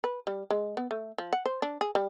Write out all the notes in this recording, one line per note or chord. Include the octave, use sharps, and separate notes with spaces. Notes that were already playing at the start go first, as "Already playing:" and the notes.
B4
G3
G#3
B3
A3
F3
F#5
C5
D4
G#4
G3